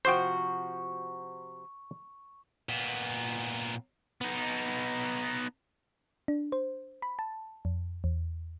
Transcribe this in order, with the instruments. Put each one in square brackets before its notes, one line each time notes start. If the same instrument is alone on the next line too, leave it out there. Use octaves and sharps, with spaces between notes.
[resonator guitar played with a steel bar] C3 F3 F#4 [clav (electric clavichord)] C5 G5 [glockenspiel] C#6
[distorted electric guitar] A#2 B3
B3 D#4
[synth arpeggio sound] D4
C5
B5
A5
F2
E2